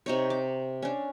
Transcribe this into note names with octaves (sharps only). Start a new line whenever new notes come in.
C3 D#4 C#5
D6
C#4 D4